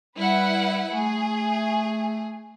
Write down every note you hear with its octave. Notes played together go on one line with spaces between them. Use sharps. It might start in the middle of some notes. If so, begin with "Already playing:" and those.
G3 E4 B4 F#5
A3 G#4